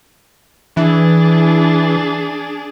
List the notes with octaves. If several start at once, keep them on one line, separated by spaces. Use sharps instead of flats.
E3 D4 G#4